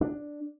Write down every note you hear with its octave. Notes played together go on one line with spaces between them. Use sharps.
D4